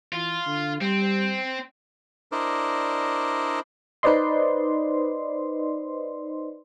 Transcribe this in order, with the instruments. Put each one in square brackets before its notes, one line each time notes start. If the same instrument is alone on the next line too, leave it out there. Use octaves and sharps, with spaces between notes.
[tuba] E3 [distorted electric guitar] F4
[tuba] D3
[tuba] G3 [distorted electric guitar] C4
[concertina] D4 E4 A#4 C5 D5 D#5
[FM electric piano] D#4 B4 C5 D5 D#5 C6